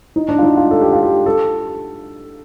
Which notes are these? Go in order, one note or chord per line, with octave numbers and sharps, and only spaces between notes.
D#4
D4
F4
D#4
F4
A4
G4
F4
G4
A4